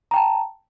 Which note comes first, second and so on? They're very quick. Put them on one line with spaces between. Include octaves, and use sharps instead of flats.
A#5 G5 A5